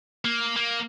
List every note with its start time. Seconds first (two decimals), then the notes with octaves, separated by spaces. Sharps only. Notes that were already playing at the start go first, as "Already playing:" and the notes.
0.25 A#3
0.56 A#3